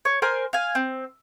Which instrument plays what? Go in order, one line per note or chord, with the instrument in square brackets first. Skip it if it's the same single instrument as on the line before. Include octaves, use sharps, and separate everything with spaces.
[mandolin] C#5
A#4 C5 G#5 C6
F5 G#5
C4